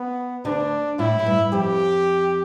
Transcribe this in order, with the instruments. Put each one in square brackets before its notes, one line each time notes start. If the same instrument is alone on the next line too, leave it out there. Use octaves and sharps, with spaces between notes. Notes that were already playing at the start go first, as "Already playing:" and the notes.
Already playing: [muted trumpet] B3
[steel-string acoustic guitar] D2 D3 [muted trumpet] D4
[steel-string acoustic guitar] A2 [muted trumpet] E4
[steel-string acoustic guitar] A2
G2
[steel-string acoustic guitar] F2 [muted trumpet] G4